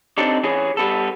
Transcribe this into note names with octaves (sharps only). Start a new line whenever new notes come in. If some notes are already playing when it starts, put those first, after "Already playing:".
C4 D4 D#4 G4 A4 D5
E3 C#4 G#4
G3 B3 A4